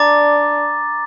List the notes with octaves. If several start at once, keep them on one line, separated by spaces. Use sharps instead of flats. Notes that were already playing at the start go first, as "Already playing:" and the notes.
Already playing: D4 A#5 D6 A6